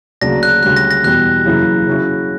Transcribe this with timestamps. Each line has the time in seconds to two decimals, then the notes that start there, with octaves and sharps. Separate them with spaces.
0.21 D2 C#3 F#3 A#3 D4 A#6
0.43 F#6
0.63 D2 C#3 G3 F#6
0.77 A#6
0.91 A#6
1.04 E2 B2 G3 F#6
1.46 F#2 C#3 E3 A#3 E4
1.86 C#3 F#3 C#4 E4